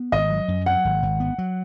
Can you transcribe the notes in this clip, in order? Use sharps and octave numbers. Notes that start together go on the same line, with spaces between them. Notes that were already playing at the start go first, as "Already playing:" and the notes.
Already playing: B3
G#1 D#5
F#3
F#2
F#3 F#5
G#1
G#1
B3
F#3